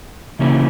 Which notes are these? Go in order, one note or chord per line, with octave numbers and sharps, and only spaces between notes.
C#3 E3 A#3 C#4 E4